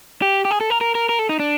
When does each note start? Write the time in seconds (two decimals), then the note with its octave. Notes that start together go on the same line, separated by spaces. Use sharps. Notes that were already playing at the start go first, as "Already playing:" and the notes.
0.22 G4
0.45 G4
0.51 G#4
0.61 A4
0.70 A#4
0.81 A#4
0.95 A#4
1.09 A#4
1.19 A4
1.29 D#4
1.39 D4